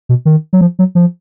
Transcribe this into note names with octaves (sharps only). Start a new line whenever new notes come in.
B2
D#3
F#3
F3
F#3
F3